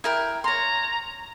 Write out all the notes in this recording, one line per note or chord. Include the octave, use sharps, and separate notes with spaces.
E4 A#4 G5
C#5 A#5 C6